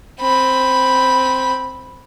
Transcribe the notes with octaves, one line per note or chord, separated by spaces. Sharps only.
C4 B5